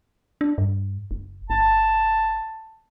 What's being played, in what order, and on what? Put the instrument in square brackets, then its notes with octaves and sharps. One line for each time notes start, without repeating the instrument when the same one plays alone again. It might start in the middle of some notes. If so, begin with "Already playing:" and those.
[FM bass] D4
G2
F#1
[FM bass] G1 [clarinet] A5